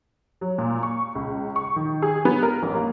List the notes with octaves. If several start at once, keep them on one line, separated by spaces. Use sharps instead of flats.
F#3
A#2
C#6
C#2
C#6
D#3
G#4
B3
A#4
A1
A#3